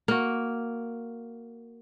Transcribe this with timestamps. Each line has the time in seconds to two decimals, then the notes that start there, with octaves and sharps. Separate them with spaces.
0.08 A#3 F#4